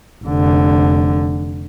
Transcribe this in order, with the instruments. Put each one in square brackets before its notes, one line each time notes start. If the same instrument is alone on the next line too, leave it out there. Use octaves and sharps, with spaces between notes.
[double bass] F1 D3